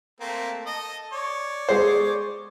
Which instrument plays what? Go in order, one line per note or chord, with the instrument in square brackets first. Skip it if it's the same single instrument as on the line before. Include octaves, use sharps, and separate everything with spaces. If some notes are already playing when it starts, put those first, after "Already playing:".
[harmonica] A3 A#3 C4
A4 D#5
C#5 D5
[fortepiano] G#3 C5